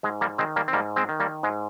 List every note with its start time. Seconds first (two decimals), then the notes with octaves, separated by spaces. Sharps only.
0.03 G#2 G#3
0.21 G3 A#3
0.38 D#3 G#3 C4
0.56 G3 A#3
0.68 C4
0.73 G#2 G3 A#3
0.96 G#3 C4
1.09 D#3
1.20 G3 A#3
1.43 G#2 G#3